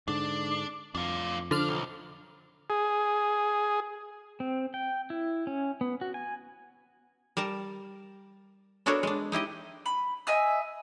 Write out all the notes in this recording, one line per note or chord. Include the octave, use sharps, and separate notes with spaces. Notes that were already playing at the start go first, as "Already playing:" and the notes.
G#2 D3 D4
F2 D4 F4
D3 F3 D4 F6
B1
G#4
C4
G5
E4
C#4
B3
F#4
G#5
G3 A#4 A5 A#5
B3 D4 F#4 A4 A#4 C#5
G#3 D4
D#4 E4 G4 D#5
B5
D#5 E5 G#5 E6